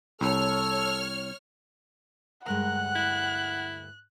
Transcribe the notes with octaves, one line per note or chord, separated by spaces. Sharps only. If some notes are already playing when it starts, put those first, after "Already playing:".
C2 A4 C#5 F6
D2 G2 G#3 A#4 F#5 F#6
E4